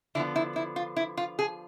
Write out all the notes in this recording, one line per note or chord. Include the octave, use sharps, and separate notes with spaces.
D3 F3 B3 E4
E4
E4
F4
E4
F4
G#4